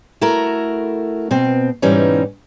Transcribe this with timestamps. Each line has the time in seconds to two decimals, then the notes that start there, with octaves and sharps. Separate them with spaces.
0.21 A3 E4 F#4 A#4
1.31 B2 C4
1.82 G#2 B2 E3 G3 C#4 D#4